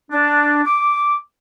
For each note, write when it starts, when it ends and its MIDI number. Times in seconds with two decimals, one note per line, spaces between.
0.12 0.61 62
0.65 1.15 86